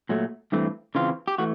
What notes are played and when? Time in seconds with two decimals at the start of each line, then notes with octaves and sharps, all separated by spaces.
0.09 A#2 F#3 A3
0.52 G2 E3 A3 C4
0.95 C#3 E3 C4 F4
1.28 G4
1.38 E3 A3 F#4